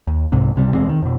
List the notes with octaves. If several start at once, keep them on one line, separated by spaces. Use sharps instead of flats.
D#2
C2 G#2 C3
C#2 C3 G3
E1 E2 G#3 C4
D#3
F2 B2